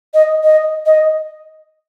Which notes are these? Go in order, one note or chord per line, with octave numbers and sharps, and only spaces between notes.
D#5
D#5
D#5